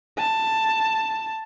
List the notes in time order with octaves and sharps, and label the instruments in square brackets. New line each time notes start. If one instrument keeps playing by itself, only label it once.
[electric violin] A5